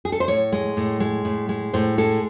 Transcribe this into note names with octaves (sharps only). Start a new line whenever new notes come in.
G#4
A4
C5
A2 C#5
G#3
A2
G#3
A2
G#3
A2 C5
G#3 A4